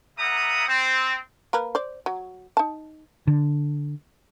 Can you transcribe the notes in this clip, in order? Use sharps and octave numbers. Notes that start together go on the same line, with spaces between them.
G3 A#3 E5 F#5 A#5 D#6
C4
A#3 A#4 B4
C5 D5
F#3
D#4 A5
D3